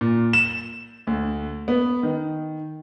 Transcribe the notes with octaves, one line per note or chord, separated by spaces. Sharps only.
A#2
E7
D2
B3
D#3